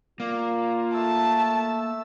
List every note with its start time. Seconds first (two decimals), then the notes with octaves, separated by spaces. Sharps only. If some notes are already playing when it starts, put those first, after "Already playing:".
0.20 A#3 F4 D5
0.94 A3 A5 E6